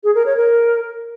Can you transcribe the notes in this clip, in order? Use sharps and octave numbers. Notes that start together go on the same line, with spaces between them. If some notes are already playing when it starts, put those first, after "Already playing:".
G#4
A#4
C#5
A#4